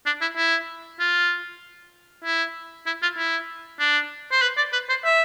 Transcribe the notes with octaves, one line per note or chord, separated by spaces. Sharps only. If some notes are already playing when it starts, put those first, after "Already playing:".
D4
E4
E4
F4
E4
E4
F4
E4
D4
C5
B4
D5
B4
C5
E5